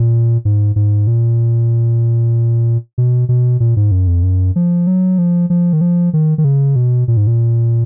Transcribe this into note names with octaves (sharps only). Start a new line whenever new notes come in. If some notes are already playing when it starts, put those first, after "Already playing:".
Already playing: A#2
G#2
G#2
A#2
B2
B2
A#2
G#2
F#2
F2
F#2
F3
F#3
F3
F3
D#3
F3
D#3
D#3
C#3
B2
A#2
G#2
A#2